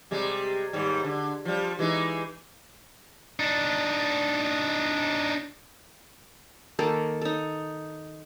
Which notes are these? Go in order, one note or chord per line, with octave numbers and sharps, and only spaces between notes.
C3 G3 G#3
D#2 G#2 G3
D3
F3 G3
E3 G#3 D#4
D4 D#4
D#3 A#3 A4
D#4 A4